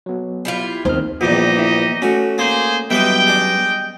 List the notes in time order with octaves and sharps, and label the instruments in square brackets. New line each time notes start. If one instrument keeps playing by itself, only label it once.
[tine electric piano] F#3 B3
[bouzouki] G3 E4 F4
[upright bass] D#2 [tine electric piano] D#3 C4 F6 [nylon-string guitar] D#4 C5
[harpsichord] A#1 E2 G2 [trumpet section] D#4 G4 D#5
[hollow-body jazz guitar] E4
[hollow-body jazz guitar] A3 C#4 [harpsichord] F#4
[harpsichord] A#3 [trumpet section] G#4 C5
[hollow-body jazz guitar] F#2 G3 B3 [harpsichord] B4 E5 [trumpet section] D#5 G5
[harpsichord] G#3 D4